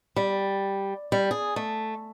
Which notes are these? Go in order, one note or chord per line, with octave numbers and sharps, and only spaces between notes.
G3
G3
G#4
A3